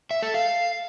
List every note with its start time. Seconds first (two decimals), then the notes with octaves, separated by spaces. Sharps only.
0.11 E5
0.22 A4
0.34 F5